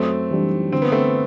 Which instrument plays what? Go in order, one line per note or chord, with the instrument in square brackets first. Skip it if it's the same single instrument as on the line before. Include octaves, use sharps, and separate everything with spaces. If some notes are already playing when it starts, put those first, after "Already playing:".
Already playing: [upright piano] F#2 [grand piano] A3 C4
[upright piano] E3 G3 D4
[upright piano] D3 [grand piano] C4
[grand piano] B3
A3 C4